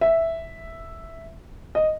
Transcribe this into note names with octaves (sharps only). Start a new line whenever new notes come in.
E5
D#5